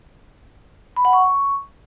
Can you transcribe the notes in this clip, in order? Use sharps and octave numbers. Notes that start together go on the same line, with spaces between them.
B5
F#5
C#6